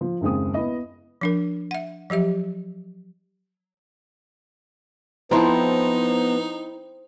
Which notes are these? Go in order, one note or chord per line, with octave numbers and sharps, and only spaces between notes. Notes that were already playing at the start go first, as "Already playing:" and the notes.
F3
F#1 D#2 C#3 G#3 C4 D#6
B3 E4 D#5
F3 D4 A#4
E5 F#5
F3 F#3 G4 E5
F3 B3 C4 D#4 E4 A4 A#5 C6